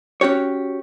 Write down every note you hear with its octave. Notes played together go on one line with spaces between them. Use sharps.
C#4 F#4 G4 C#5